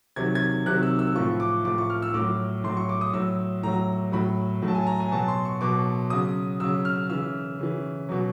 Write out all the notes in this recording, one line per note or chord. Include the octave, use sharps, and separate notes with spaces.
C3 D#3 F#3 G#6
G#6
C3 D#3 F#3 F#6
E6
E6
A2 F3 C#6
D6
A2 F3 D6
C#6
F6
E6
A2 F#3 D6
A2 F#3 C6
C#6
D6
D#6
A2 F#3 E6
A2 F#3 A#5
A2 F#3 B5
A2 F#3
A5
G#5
A#5
G#5
B2 F#3 A5
C6
C#6
B2 F#3 D6
C#3 F#3 D#6
C#3 F#3 E6
F6
C#3 E3 E6
C#3 E3
B2 F#3